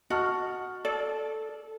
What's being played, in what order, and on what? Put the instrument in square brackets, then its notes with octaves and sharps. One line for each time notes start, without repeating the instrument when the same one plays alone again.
[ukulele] F#4 [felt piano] D#5 A5 F6
[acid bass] A4 [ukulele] D5